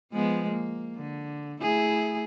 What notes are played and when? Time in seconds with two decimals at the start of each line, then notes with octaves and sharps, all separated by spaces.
0.12 F3 G#3 B3
0.49 A#3
0.96 D3
1.60 A3 E4 G#4